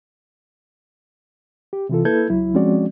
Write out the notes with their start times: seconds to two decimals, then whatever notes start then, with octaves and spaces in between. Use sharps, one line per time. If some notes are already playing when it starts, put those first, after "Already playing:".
1.73 G4
1.89 C3 E3 F4 A4
2.05 A#3 E4 A4 B4 G6 G#6
2.29 C#2 F#3 E4
2.54 F3 G#3 C4 C#4 F#4 D5